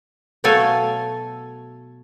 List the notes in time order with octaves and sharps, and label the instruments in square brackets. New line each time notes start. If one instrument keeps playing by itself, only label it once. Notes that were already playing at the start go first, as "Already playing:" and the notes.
[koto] B2 F#3 A3 A4 F5 G#5